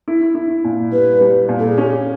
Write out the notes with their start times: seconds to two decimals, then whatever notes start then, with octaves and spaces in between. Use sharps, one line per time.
0.08 E4
0.35 E4
0.64 A#2
0.92 G3 B4
1.21 G3
1.49 A#2
1.59 A4
1.68 G#4
1.78 C#4 G4